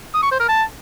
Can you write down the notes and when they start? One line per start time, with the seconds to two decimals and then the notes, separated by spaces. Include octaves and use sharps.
0.14 D#6
0.23 C#6
0.31 C5
0.40 A#4
0.49 A5